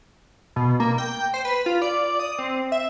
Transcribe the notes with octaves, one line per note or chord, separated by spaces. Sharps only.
B2
A#3
G5
C5
B4
F4
D5
D#6
C4
E5